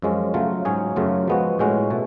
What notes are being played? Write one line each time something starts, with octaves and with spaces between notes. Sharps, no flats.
F#2 F3 G#3 C#4
C#3 F#3 A3 F4
G#2 F#3 C#4 G#4
F#2 C#3 F#3 A3 F4
F3 G#3 B3 F#4
A2 G#3 C#4 F#4
B2 A3